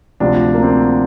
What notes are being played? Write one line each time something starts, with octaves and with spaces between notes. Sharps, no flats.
D2 C3 F3 D4
A#3
C4